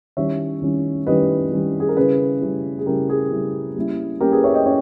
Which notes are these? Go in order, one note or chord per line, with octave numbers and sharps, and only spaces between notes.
D#3 G3 C#4 E4 C#5 E5
D#3 G3 C#4 E4
D#3 G3 C#4 E4 B4 D#5
D#3 G3 C#4 E4
G#4
A#4
C#3 G3 C#4 E4 G#4 B4
C#3 G3 C#4 E4
G#4
C#3 G3 C#4 E4 G4 A#4
G#4
C#3 G3 C#4 E4
G3 A#3 C#4 E4
G3 A#3 C#4 E4 G4 A#4
G#4 B4
C#5 E5
D#5 G5
C#4 E4 C#5